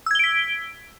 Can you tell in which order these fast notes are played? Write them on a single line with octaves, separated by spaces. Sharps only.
E6 G#6 G7 D7 B6